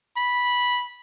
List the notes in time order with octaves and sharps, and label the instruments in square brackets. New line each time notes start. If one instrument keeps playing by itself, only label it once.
[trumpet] B5